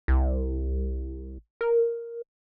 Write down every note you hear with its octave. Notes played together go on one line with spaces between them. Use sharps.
C2
A#4